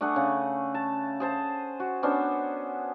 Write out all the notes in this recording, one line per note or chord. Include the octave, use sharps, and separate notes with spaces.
A3 D4 G#4 F#5
C#3
A5
G#4 C5 A5
F#4
B3 C#4 D4 C5